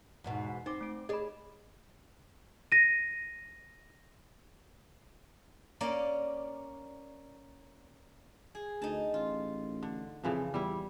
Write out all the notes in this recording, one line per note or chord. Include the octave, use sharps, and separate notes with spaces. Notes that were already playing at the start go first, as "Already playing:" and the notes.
E2 G#2 B2
C4 D#4 D6
A3 D7
G#4 D5 D#5 B5
A#6 D#7
A#3 C#4 A#4 D5
G#4
D2 D#4 A5
A1 F4
D3
F2 C#3 E3 F3
E2 G3 E4